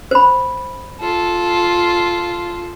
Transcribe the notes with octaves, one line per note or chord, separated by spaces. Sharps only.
C5 B5
F4 A4